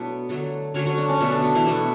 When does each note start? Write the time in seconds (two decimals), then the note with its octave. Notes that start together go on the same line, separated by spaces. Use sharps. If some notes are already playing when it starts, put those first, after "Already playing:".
Already playing: B2 F#3 A3 D4 E4
0.29 D3 F#3 A3
0.74 D3 F#3 A3 C#4 C#5
0.86 F#3 F#4
0.98 D4
1.09 C#4
1.21 B2 A3 D4
1.32 D4
1.44 D4
1.55 E3 E4
1.67 B2 A3 D4